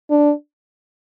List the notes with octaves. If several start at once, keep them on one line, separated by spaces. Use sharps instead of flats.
D4